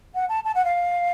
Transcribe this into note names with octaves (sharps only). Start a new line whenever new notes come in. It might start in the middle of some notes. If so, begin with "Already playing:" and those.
F#5
A5
A5
F#5
F5